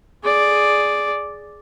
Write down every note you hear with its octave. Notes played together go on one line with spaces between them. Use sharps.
G#4 D5